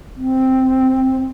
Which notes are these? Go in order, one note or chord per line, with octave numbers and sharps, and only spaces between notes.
C4